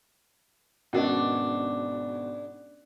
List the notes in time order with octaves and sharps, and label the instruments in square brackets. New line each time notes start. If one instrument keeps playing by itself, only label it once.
[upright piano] G#1 B2 F#4 [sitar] G#2 D4 [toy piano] C#4 A#4 D#5